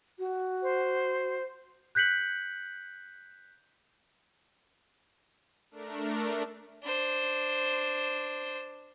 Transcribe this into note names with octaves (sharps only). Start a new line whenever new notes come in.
F#4
C5
F#6 G6 B6 C#7 F#7
A3 D4 A#4
D4 C5